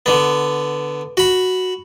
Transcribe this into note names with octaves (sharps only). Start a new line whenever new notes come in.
D3 B3
F#4 B5